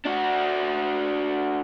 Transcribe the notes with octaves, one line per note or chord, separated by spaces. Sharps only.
D4 F#4